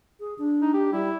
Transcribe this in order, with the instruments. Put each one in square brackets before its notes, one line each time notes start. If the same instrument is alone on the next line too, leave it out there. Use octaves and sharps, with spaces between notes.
[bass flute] G#4
D4
[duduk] D#4
G4
[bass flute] G3 [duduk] E4